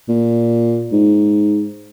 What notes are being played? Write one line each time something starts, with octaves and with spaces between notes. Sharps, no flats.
A#2
G#2